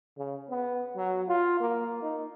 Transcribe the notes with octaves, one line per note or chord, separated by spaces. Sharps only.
C#3
B3
F#3
F4
A#3
D#4